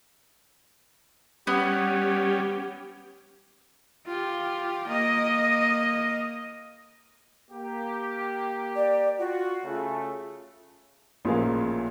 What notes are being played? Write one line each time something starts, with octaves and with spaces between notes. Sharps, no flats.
G3 B3 C#4 G4
F4 G4
A#3 D#5
A#3 G4
D5
F4 F#4
C#3 A3
A1 A#2 F3 G#4 A#4 F5